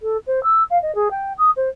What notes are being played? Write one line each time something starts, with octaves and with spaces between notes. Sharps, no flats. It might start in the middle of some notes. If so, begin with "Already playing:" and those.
A4
C5
E6
F5
D#5
G#4
G5
D#6
C5